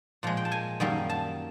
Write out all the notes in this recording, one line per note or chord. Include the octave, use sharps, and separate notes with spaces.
A#2 F3 G#3
G5
A5
G#5
F#2 D#3 G3 A#3
A5